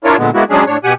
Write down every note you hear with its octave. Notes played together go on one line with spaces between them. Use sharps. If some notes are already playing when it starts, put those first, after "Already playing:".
D4 E4 F4 A#4 C#5
A#2 D3 G#3 B3
G#3 A#3 B3 E4 F#4
F#3 G#3 C#4 D4 G#4
A2 D4 C#5
B2 G4 F#5 G#5